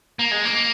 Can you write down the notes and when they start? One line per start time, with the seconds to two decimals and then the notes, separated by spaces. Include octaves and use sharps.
0.19 A#3
0.31 G#3
0.45 A#3